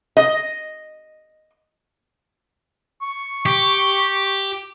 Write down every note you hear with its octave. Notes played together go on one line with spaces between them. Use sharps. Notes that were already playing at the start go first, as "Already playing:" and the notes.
D#5
C#6
G4